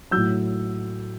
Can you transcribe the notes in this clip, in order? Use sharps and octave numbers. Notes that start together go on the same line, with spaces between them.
A2 F#3 E6 G6